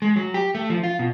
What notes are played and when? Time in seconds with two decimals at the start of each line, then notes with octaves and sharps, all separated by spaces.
0.02 G#3
0.16 F#3
0.34 G4
0.55 A3
0.70 F3
0.83 F4
0.99 B2